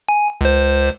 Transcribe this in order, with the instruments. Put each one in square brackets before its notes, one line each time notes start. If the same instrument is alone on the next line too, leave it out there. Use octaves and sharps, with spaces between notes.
[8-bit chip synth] G#5
C#2 C5